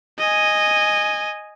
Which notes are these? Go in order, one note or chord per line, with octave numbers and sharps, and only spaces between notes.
D#5 G#5